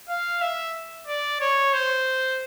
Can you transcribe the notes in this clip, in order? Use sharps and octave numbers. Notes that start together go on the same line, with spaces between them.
F5
E5
D5
C#5
C5